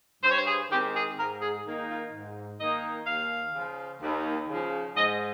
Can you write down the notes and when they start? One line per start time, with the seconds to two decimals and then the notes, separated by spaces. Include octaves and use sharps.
0.24 G2 C5
0.30 C#5
0.38 C5
0.47 G#4
0.70 D#3 G#3 C4 G4
0.95 G#4
1.18 G#2 A#4
1.41 G#4
1.65 D#3 A#3 D#4
1.89 F4
2.12 G#2
2.60 D#3 A#3 D#4 D#5
3.07 D#2 F5
3.55 C#3 F3
4.01 D#2
4.48 C#3 F3
4.96 G#2 D#5